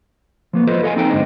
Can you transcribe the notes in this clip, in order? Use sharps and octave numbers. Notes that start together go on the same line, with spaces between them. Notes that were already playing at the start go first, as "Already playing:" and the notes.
F3 A#3 B3
F4 A4 B4 C5 D#5
A4 D#5 F5 F#5 G#5
C4 D#4 A4 G5
D2 G2 G#3 D4 C5 D#5